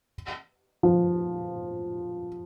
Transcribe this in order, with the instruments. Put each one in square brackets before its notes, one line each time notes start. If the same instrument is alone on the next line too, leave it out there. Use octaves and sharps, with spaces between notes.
[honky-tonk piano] F3